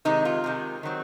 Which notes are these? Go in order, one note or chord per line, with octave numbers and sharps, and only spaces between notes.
C3 D#3 G#3 D#4
F4
C3 D#3 G#3
D#3 F#3 C4